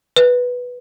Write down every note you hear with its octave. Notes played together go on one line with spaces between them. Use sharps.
B4